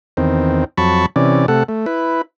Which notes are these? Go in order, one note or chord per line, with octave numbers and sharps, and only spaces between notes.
E2 D#3 C4
F2 F#3 A5 B5 C#6
C3 E3 C#4 D5
C3 A3 A4 F#5
A3
E4 B4